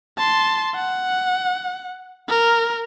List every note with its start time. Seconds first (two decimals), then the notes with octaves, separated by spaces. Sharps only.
0.18 A5 C6
0.75 F#5
2.29 A#4